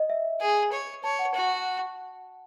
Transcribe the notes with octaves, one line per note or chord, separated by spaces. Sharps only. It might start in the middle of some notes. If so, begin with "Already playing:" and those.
Already playing: D#5
E5
G#4
C#5
C#5 A5
F#5
F#4